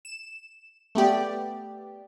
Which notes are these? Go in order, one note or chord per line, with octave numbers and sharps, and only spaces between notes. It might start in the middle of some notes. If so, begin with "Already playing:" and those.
E7
A3 B3 G4 D5